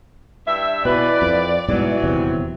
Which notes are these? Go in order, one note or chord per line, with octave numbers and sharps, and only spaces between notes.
G2 E5
B2 E3 B4 D5
F2
G#2 B2 E3 F#3 G3
D#1 E2 C3